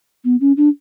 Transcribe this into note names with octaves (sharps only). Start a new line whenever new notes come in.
B3
C#4
D4